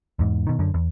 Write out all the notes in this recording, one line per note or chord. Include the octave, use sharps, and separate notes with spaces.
E2 G#2
B2 D#3
F#2 D3
E2